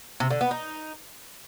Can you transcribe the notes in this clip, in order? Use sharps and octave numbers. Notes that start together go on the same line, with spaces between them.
C3
D3
B3
D#4